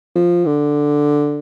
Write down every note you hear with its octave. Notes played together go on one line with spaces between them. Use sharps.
F3
D3